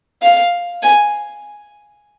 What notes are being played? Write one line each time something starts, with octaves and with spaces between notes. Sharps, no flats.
F5
G#5